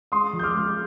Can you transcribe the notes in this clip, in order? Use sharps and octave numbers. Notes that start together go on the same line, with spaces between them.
G#3 C6 D#6
F3
G6
D6 F6
G#3